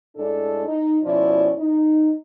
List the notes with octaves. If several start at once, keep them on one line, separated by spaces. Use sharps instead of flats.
A2 G#3 D4 A4
D#4
D2 B2 F3 C#4 E4 D5
D#4